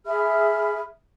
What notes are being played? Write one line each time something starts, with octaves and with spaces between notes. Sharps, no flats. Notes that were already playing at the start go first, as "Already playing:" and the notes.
G#4 E5 B5 F6